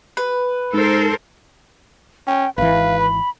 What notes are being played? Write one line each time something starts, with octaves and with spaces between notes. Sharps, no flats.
B4
G#2 A4 A#4 C5
C#4 G5
G#1 E3 B4 F5
B5